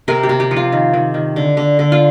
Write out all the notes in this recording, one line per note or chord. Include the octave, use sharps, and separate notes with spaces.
C3 A#4
G4
C3
G4
F3
F4
D#3
D#3
D#3
D3
D3
D3
F4